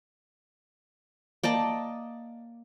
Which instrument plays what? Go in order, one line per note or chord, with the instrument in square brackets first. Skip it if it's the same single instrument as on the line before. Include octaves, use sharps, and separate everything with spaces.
[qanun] A#3 D5 D#5 A5